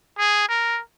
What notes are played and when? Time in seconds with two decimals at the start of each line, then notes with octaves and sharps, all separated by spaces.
0.18 G#4
0.49 A#4